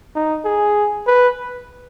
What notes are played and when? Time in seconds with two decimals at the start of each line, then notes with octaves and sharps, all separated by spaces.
0.15 D#4
0.45 G#4
1.07 B4